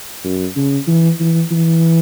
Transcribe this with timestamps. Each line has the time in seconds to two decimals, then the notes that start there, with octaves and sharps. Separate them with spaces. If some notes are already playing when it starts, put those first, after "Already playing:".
0.24 F#2
0.56 C#3
0.87 E3
1.20 E3
1.51 E3